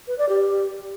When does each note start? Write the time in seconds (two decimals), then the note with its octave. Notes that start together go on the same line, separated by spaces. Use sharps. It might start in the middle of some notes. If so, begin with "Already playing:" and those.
0.08 B4
0.18 D5
0.29 G4